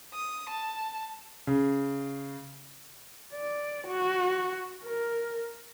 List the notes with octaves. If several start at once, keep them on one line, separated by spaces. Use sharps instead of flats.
D#6
A5
C#3
D5
F#4
A#4